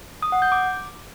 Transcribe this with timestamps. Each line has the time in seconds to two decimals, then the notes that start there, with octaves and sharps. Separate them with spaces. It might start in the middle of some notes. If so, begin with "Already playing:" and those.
0.22 D#6
0.32 F#5
0.42 G6
0.52 D6